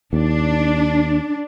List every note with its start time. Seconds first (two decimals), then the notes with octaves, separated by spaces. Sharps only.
0.13 D#2 D4